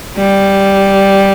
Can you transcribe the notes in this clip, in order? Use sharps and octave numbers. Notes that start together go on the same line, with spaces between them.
G3